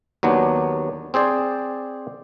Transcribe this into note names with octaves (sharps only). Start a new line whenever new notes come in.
D#2 F#3 B3 D4
C4 G#4 C5 D5